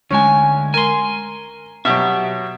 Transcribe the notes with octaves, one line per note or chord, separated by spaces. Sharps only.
D2 G#3 C#4 G#5
A#4 G#5 C6
B2 F#3 G4 E5